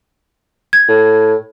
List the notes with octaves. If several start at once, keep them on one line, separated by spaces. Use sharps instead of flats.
G#6
A2